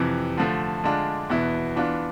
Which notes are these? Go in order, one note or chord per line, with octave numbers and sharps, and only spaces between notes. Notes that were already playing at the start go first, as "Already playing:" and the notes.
Already playing: F2 C3 E3
D3 F3 A3
D3 G#3 D4 F4
E2 B2 B3 E4
E3 B3 D4 F4